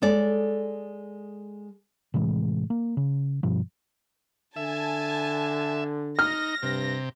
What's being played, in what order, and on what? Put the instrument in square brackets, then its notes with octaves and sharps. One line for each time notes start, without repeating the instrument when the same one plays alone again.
[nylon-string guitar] G#3 A4 D5
[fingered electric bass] A2 C3 E3 G#3
A#3
C#3
G2 B2 F3
[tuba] D3 [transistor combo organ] E5 [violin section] G#5 A5
[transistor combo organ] D#4 [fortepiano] F6 [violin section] A#6
[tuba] G2 [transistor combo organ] C3